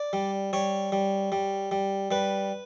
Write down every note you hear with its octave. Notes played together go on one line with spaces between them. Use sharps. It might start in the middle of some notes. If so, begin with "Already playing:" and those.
Already playing: D5
G3
G3 C#5
G3
G3
G3
G3 B4